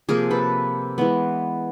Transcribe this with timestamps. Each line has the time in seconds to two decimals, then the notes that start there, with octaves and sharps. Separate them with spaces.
0.09 C3 F3 A#3 G#4 A#4
0.31 A4 B4
0.98 E3 G#3 B3